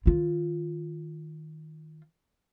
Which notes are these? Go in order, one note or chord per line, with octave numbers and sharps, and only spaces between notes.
D#3 F4